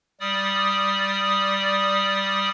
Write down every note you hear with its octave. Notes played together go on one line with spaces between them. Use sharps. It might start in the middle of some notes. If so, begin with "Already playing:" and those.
G3 D5 D#6